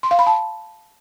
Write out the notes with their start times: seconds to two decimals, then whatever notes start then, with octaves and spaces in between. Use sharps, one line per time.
0.03 C6
0.11 F5
0.19 B5
0.27 A5